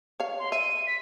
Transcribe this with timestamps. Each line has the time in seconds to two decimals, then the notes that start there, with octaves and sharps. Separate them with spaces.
0.20 C#5 F5
0.39 C6
0.52 E5 D#7
0.87 B6